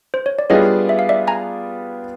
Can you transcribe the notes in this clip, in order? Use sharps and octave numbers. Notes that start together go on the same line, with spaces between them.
C5
C#5
D5
G3 B3 D4 F4 G#4 C#5 D#5
E5
F5
D5 E5
G#5 A#5